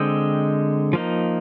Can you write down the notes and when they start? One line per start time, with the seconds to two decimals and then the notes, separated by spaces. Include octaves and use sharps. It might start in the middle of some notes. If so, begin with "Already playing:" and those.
Already playing: D3 G#3 C4 D#5 G5
0.93 F3 A#3 D#4